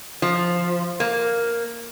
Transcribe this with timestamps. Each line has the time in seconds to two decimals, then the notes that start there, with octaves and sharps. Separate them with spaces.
0.22 F3
1.00 A#3